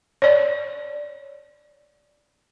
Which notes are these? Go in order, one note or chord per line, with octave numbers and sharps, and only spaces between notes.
C#5 D5